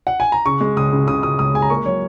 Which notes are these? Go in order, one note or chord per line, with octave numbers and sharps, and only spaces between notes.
F#5
G#5
A#5
C#3 C#6
G#3
C#2 D#6
C#3
C#3 D#6
C#2 D#6
C#2 D#6
G#3 G#5
A#5
A#3 C#6
F#3 C#5